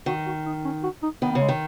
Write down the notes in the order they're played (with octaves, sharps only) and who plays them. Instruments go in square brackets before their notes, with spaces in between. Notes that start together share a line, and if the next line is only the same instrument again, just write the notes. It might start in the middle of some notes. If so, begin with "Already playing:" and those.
[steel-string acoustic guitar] D#3 [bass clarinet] F#4
[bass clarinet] F#4
D#4
C#4
F#4
D#4
[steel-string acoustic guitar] D#3 [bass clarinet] B3
[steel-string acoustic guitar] C#3 [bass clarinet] B3
[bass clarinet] G#3
[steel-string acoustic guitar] D#3